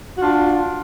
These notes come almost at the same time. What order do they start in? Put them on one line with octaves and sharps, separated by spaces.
F#4 F4 D4